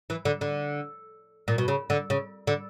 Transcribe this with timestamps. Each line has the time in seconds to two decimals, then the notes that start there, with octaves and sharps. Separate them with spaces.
0.10 E3
0.25 D3
0.41 D3
1.48 A#2
1.58 B2
1.68 C#3
1.90 D3
2.10 C#3
2.47 D3